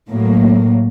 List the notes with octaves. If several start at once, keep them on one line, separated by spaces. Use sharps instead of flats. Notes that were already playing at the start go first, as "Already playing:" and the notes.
A2 F#3 A#3